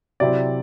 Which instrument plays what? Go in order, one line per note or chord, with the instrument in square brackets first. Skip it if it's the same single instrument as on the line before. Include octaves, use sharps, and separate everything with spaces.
[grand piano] C3 F#3 C4 E4 D5